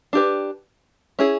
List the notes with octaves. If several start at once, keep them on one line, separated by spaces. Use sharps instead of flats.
D4 G4 B4
C#4 E4 G#4